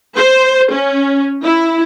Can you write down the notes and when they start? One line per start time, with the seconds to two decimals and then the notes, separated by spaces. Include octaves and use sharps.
0.16 C5
0.73 C#4
1.44 E4